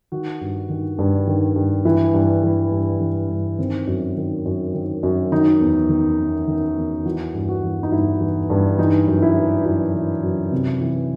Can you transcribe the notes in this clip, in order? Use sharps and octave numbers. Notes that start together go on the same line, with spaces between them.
D#3 F#4
G2
D#3
G2
D#3
G2
E3 E4
G2
E3
G2
E3
G2
D#3 C4
F#2
D#3
F#2
D#3
F#2
D#3 D#4
E2
D#3
E2
D#3
E2
E3 F#4
G2
F#4
E3
D#4
G2 E4
E3
G2
E3 D#4
F#2
E4
E3
F#2 E4
E3
F#2
C3
E3